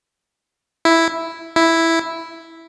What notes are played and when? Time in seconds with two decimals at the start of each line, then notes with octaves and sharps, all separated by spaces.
0.85 E4
1.56 E4